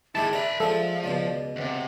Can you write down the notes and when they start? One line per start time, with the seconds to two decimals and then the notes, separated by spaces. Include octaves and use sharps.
0.15 D#3 G#3 E4 G4 G#4 E5 A5
0.33 A#4 D5 E5 B5
0.60 F3 G#3 D4 A4
1.04 C#2 B2 D5
1.56 D2 C3 F#5